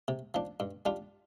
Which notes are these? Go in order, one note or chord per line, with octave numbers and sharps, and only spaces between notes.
C3
F3 D4
G2
G3 D4 F4